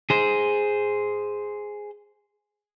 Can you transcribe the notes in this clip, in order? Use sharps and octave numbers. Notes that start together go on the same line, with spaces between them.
G#4 C5